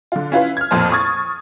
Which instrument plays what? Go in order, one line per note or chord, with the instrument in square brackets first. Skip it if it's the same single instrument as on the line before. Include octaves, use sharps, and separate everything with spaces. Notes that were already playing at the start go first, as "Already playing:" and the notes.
[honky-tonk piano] D3 F4
C#4 E4 F4 B4 F5
F6 G#6
A1 F2 A#2 C5 A5
C#6 D#6 G#6 A6